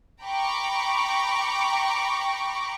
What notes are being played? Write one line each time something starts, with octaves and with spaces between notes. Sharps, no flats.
G5 A#5 B5 C#6 D6